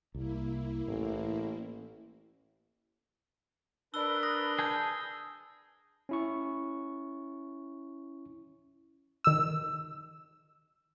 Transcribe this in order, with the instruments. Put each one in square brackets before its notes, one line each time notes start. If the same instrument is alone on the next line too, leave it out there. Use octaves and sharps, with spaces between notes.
[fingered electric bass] C2 [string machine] A#3 E4
[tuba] A1 [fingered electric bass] A2
[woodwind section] D4 A#4 B4 [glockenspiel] E6 [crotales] G7
[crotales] D#6 [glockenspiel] A#6
[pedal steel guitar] G#4 A5 G6 [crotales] G#6
[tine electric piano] C#4 E4 C#6
[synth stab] D#3 E6